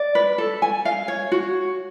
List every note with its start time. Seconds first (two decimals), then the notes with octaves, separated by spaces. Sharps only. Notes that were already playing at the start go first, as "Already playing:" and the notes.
Already playing: D5
0.15 B4
0.38 A4
0.62 G#5
0.85 F5
1.08 C#5
1.32 F#4